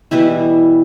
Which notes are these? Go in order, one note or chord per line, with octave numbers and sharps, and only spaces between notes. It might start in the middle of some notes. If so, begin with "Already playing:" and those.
B2 E3 G3 E4